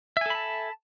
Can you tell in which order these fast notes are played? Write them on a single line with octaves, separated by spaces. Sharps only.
E5 G#5 A4 B5 A5